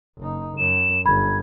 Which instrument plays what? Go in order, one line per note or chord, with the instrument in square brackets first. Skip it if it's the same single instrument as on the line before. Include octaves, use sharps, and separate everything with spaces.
[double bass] F#1 D#4
[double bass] F#2 [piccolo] E7
[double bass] G1 [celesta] B5 [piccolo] G#6